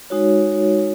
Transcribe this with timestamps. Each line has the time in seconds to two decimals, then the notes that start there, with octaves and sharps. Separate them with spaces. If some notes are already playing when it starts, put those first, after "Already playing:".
0.10 G#3 D#4 F#4 C#5